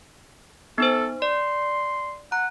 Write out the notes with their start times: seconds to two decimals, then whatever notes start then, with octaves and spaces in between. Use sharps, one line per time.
0.78 B3 D#4 A4 C5
1.22 D5 C6
2.32 F#5 A#5